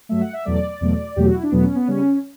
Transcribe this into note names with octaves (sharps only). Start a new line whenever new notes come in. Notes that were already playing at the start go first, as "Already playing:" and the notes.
G2 F#3 A3 E5
F#5
E5
E2 B2 F#3 A3 D5
E2 B2 F#3 A3
E2 B2 F#3 A3 G4
F#4
E4
D4
E2 B2 F#3 A3 B3
C#4
B3
C#3 G3 C#4